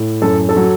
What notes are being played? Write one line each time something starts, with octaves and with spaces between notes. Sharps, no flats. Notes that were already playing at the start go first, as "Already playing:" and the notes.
Already playing: A2
F#2 A4
A4
F#3